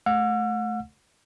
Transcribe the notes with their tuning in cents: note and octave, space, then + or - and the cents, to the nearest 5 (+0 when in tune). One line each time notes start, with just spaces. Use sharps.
A3 -20 F#5 -40 E6 +35